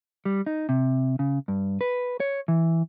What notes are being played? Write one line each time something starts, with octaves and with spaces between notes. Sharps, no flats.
G3
D#4
C3
C#3
G2
B4
C#5
E3